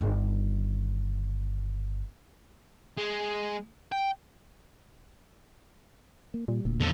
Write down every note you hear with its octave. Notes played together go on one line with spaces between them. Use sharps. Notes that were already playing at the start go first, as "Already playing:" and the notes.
G1 D#3
G#3
G5
A#3
A#2 G3
D#1 D2 A#2
E2 D3 F3